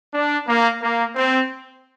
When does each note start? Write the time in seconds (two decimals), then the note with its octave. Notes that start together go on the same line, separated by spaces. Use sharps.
0.13 D4
0.47 A#3
0.81 A#3
1.15 C4